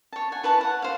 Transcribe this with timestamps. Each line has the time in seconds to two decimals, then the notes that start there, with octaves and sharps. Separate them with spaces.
0.13 C#5 A5
0.32 F#5 G#5
0.43 E4 B4 C#5 A5
0.61 F#5
0.82 C5 F5